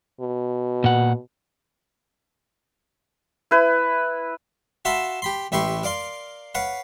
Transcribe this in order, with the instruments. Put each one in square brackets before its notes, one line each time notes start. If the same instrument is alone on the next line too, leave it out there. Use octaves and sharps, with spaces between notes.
[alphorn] B2
[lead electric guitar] A#2 F#5
[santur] E4 B4
[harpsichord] F#4 E5 F5 A5 B5 C6
G4 B5 C6
A1 E4 G4 B4 C6 C#6
A#4 D5 F5 C6
B4 C#5 F5 F#5